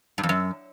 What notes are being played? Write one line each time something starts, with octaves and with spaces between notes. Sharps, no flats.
G2
F2
F#2